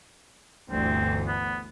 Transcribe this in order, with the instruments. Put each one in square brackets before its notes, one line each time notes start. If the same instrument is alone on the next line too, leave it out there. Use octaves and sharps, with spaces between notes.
[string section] G1 D2 E3 [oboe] C4
[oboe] B3